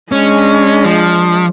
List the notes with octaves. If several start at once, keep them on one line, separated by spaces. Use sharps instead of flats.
G#3 C#4 D4
F3